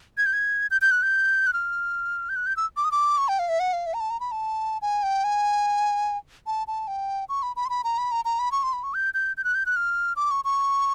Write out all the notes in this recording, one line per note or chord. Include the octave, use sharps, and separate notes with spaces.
G#6
G6
G#6
G6
G6
F#6
G6
F#6
F6
G6
F#6
G6
E6
D6
D#6
D6
C#6
G5
F5
E5
F#5
F5
E5
A#5
A5
A#5
B5
A5
G#5
G5
G#5
A5
A5
G5
C#6
B5
B5
C6
B5
A#5
B5
A#5
A#5
B5
C#6
C6
B5
C#6
G6
G6
G6
F#6
G6
F#6
F6
D6
C#6
C#6